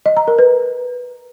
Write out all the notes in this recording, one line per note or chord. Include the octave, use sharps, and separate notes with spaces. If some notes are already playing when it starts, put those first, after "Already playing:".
D#5
A#5
A#4
B4